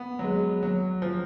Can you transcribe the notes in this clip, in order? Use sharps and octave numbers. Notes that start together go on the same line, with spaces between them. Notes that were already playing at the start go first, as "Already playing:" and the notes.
Already playing: B3
F#3
G#3
F#3
F3